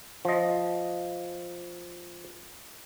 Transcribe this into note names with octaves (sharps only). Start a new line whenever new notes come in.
F3 D#5